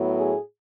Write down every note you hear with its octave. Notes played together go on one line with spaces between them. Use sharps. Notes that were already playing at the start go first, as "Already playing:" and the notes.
Already playing: A2 F#3 B3
G#4